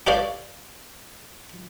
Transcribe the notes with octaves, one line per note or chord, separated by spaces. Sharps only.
G4 A4 B4 C#5 D5 F5